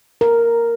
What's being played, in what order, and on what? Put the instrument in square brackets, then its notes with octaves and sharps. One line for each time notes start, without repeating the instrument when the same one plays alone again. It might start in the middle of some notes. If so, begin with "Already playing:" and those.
[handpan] A#4